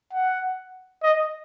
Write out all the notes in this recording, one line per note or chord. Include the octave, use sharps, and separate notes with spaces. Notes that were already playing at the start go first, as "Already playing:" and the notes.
F#5
D#5